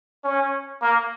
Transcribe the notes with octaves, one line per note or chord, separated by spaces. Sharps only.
C#4
A#3